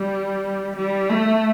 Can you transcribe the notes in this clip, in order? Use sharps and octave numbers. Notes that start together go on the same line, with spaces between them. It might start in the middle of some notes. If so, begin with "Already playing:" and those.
Already playing: G3
G3
A3